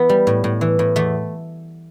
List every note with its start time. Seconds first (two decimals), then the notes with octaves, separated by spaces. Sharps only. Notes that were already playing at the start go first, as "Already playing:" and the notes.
Already playing: E3 B3
0.09 G3
0.27 A2
0.44 A2
0.61 E3
0.79 A2
0.96 E2 A3